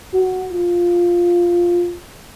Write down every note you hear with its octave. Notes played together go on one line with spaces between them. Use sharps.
F#4
F4